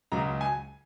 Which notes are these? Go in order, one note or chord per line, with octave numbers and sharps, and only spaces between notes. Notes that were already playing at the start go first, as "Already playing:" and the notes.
C#2 C#3 F#3 A#5
G#5